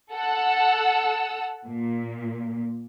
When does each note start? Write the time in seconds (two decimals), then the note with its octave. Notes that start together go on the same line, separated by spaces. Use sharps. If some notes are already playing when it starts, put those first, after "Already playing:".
0.14 A4 F#5 E6
1.66 A#2